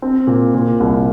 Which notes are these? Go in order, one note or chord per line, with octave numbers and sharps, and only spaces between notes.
C4
A#2
A#2
C2